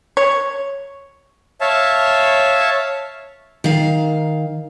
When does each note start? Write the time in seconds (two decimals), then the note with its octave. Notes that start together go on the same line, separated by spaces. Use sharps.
0.17 C#5
1.61 C#5 E5 F5 A5
3.64 D#3 F5